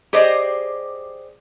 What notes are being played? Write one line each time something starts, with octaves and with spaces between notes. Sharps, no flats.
G4 G#4 C5 D5 D#5